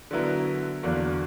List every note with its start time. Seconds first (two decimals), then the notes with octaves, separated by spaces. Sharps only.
0.11 D3 F#3 B3 E4 A#4
0.83 E2 D3 F#3 A#3